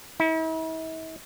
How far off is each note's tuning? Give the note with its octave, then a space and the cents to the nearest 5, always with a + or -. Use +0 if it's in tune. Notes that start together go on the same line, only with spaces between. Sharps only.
E4 -45